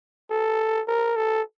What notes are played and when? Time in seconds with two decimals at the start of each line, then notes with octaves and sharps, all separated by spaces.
0.30 A4
0.88 A#4
1.16 A4